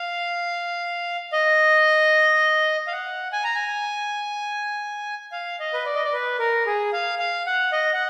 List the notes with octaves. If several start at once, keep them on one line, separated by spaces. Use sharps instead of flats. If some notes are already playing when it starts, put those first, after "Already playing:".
Already playing: F5
D#5
F5
F#5
G#5
A#5
G#5
F5
D#5
B4
D5
D#5
D5
B4
A#4
G#4
F5
F5
F#5
D#5
F#5